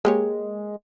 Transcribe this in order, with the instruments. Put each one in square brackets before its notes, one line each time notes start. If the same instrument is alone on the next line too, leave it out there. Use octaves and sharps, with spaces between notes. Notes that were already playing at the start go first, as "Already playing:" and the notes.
[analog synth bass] G#3 [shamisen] A#3 G4 C#5